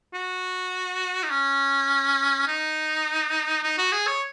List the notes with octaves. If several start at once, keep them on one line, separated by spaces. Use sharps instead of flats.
F#4
D#4
C#4
D#4
D#4
F#4
G#4
C#5